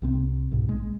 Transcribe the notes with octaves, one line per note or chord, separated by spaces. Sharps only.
C2 C3 C4
C2 G#2 B2
A#1 G#3